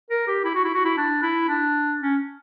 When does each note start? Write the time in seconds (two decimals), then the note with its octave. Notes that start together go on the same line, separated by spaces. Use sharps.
0.10 A#4
0.27 G4
0.44 E4
0.55 F#4
0.64 E4
0.75 F#4
0.85 E4
0.97 D4
1.22 E4
1.48 D4
2.01 C#4